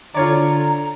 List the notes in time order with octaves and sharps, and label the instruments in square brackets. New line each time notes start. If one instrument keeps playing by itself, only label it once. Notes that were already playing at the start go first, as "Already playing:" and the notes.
[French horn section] D3 [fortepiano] F4 C#5 D5 [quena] A#5